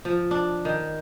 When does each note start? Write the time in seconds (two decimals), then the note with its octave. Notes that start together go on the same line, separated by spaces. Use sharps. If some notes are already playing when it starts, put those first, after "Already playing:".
0.05 F3
0.31 D4
0.65 D#3